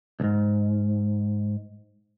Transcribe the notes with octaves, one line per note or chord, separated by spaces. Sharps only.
C2 G#2